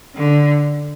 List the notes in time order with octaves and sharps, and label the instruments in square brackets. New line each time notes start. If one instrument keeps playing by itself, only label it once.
[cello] D3